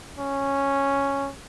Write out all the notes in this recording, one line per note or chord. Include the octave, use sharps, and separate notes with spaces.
C#4